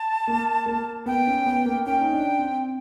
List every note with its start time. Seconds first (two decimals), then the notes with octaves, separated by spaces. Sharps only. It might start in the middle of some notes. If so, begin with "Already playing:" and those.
Already playing: A5
0.27 A#3
0.66 A#3
1.06 B3 G5
1.27 C#4
1.46 B3
1.65 A#3
1.86 C#4 G5
2.01 D#4
2.13 D4
2.39 C4